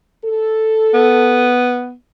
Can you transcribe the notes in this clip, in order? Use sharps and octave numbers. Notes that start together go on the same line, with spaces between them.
A4
B3